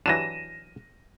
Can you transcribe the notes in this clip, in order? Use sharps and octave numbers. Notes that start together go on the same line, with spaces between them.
E3 F#3 D4 A#6 D#7 E7